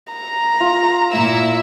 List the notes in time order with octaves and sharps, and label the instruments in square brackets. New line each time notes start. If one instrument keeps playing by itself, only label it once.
[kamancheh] A#5
[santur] F4
[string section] A#2 E4 E6